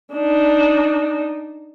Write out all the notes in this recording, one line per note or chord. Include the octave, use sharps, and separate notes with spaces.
D4 D#4